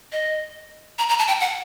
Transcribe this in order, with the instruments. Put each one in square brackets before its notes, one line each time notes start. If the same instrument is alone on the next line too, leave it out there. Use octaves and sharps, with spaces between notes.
[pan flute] D#5
A#5
A#5
A5
G5
F#5